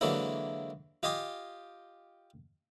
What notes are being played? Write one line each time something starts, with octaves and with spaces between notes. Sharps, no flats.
D3 E3 F#3 G#3 A#3 E4
F4 G4 D#5 G#5 C6